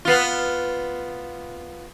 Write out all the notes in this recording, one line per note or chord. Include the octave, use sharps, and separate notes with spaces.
B3 F4